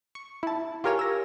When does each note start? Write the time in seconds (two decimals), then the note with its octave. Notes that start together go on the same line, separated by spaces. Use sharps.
0.15 C#6
0.43 E4 A5
0.84 F4 G4 A#4 C#5 G#5 F6
0.99 E6 A#6